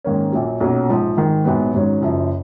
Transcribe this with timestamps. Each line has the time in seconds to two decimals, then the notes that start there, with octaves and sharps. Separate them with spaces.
0.04 G#2 D#3 A#3 C#4
0.32 A#1 A#2 F#3
0.60 B1 A#2 F#3 C#4
0.89 A#1 G#2 F3
1.17 G#1 G#2 D#3
1.45 A#1 G#2 F#3 B3
1.73 G#1 G#2 F#3 C#4
2.02 F#1 F#2 F3